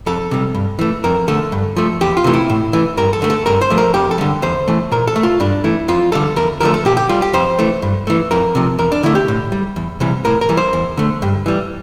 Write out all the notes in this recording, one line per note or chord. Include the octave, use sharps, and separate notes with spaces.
F2 A4
C3 G3
G2
E3 A3
F2 A#4
D3 A3 A4
G2
F3 A3
E2 G4
F4
C3 E3 A3
E4
A2
E3 A3
G2 A#4
A4
D3 A3
A4
G2 A#4
C5
F3 A3
A#4
F2 G4
A4
D3 G3
E2 C5
E3 A3
A#2 A#4
A4
A3
F4
G2 D4
E3 A3 E4
F2 F4
D3 G3 A4
E2 A#4
D3 F3 A3 A#4
A4
A#2 G4
G4
G3 F4
G4
F2 C5
E3 A3
G2
E3 A3
F2 A#4
C3 F3
E2 A#4
D4
D3 A3 E4
G4
A2
G3
E2
C3 E3 G3
A2 A#4
A#4
E3 G3
C5
E2
D3 A3
G2
E3 G3